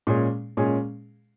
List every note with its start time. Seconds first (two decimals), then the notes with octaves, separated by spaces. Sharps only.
0.07 A#2 G#3 C#4 G#4
0.57 A#2 G#3 C#4 G#4